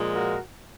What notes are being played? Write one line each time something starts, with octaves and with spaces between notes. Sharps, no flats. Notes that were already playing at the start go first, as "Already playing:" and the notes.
Already playing: A#2 F3 G#3
F#4 A#4